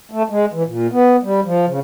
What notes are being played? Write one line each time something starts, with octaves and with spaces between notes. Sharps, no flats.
A3
G#3
E3
A#2
B3
G3
F3
C#3